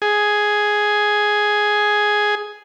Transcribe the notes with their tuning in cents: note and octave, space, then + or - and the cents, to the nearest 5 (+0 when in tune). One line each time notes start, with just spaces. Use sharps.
G#4 +5